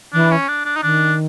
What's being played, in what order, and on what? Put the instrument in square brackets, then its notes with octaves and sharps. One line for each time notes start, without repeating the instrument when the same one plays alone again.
[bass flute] E3 [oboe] D4
[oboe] C#4
D4
D4
D#4
[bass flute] D#3 [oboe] D4